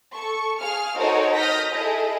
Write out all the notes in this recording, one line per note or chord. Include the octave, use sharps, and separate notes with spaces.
A4 C#6
G#4 F5 F6
D#4 F#4 A4 A#4 C5 C#5
D#6 F6 G6 A#6 B6
E4 G#4 A4 D#5